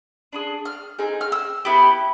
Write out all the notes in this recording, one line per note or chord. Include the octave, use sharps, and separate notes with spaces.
D4 F4 G#4
F6
C4 D#4 G#4
F6
E6
B3 E4 G4